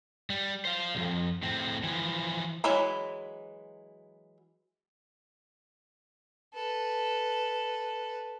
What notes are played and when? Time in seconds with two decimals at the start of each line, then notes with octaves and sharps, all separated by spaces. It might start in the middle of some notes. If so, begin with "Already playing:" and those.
0.30 G3
0.65 C5 F5
0.95 C2 F2
1.43 A2 C4
1.84 E3 F3
2.64 E3 F#3 G#3 E4 B5
6.54 A4 B4